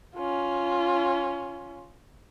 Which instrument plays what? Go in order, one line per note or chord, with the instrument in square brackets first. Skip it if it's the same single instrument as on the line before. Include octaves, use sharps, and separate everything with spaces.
[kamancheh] C#4 F4